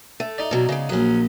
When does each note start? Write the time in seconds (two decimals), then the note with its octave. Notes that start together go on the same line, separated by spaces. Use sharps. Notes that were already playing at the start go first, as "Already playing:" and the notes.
0.20 A3
0.38 D#4 D5
0.51 B2 F#3
0.69 C#3 G#3
0.89 A#1 F#3 C#4 D#6